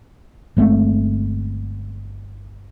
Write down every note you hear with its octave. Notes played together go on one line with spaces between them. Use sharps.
G1 G#3 A3 C4